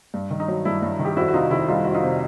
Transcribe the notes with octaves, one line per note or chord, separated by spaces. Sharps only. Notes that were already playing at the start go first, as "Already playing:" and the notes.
G2
D#3
D#4
F#3
G2 E4
G2
D#3
G4
F2 E4 F#4
F#4
C3 D#4 F4
D#3 E4
G3 D#4 F4
F2 F#4
D#4 F4
C3